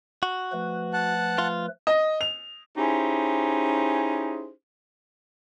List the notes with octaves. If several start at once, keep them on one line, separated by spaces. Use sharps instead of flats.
F#4
F3 A3 B4
F#5 A5 F#6
F4
D#5
F7
C#4 D#4 E4 G4 G#4 C5